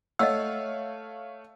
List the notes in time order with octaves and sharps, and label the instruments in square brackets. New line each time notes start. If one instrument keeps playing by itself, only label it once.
[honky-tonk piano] A3 C#5 F5 [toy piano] D#5 F#5 E6